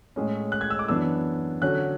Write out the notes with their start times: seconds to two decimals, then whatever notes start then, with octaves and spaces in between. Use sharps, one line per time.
0.16 A2 G#3 C#4
0.52 F#6
0.61 G#6
0.70 E6
0.79 D6
0.88 F#2 E3 B3 D4 E6
1.62 D3 F#3 C#4 F#6